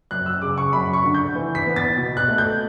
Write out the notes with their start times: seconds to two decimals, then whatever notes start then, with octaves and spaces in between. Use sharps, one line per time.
0.11 F#2 F#6
0.26 E6
0.42 C#3 D6
0.58 C#6
0.73 F#2 B5
0.93 C#6
1.04 D3
1.15 G6
1.35 E3
1.55 B6
1.66 B3
1.76 A6
1.96 B2
2.17 F#6
2.28 A3
2.38 G6